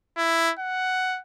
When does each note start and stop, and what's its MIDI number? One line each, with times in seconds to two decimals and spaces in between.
0.17 0.52 64
0.59 1.19 78